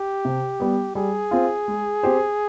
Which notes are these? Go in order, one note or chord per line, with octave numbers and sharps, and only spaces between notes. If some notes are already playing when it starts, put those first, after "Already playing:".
Already playing: G4
C3
G3 B3
G3 G#4
C4 F4
G#3
C4 G4 C5